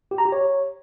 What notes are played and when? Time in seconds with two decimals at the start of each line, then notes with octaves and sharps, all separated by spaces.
0.11 G4
0.18 A#5
0.25 G4
0.32 C#5